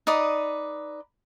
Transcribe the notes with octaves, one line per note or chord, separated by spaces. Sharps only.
D#4 B4 D5 D#6